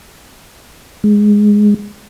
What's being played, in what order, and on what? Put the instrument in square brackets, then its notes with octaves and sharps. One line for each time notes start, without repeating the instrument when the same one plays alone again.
[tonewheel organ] G#3